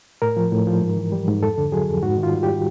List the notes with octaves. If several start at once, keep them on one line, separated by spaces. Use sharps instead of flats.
A2 A#4
F3
A2
F3
G#2
E3
G3
G#2
F2 A4
D3
F#3 G#4
F2
G#2 F#4
D#3
F4
G3
G4